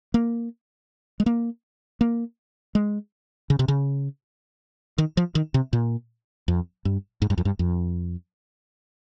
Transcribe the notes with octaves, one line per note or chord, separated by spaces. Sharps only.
A#3
G#3
A#3
A#3
G#3
C#3
C3
C#3
D#3
F3
D#3
C3
A#2
F2
G2
G#2
G2
F2
G2
F2